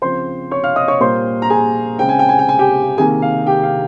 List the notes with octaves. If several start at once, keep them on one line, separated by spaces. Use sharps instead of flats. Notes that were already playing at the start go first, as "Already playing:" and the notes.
C#3 F3 C4 C5 C6
C#5 C#6
F5 F6
D#5 D#6
C#5 C#6
A#2 G3 A#3 C5 C6
A#5
G#4 G#5
C#3 G#3 C4 G5
G#5
G5
G#5
G5
G#5
G4 G5
C3 D#3 A#3 G#4 G#5
F5
G4 G5
F5